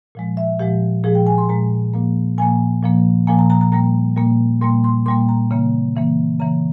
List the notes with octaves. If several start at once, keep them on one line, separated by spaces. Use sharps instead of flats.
A#2 F3 G#3
E5
A#2 F3 G#3 G4
A#2 F3 G#3 G#4
G5
G#5
C6
A#2 F3 G#3 A#5
A#2 F3 A#3
A#2 F3 A#3 G#5
A#2 F3 A#3
A#2 F3 A#3 G#5
A#5
A#5
A#5
A#2 G3 A#3 A#5
A#2 G3 A#3
A#2 G3 A#3 C6
C6
A#2 G3 A#3 C6
A#5
C#3 E3 A#3
C#3 E3 A#3
C#3 E3 A#3 A#5